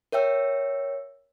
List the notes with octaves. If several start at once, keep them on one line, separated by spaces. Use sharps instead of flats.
A#4 C#5 E5 G5 E6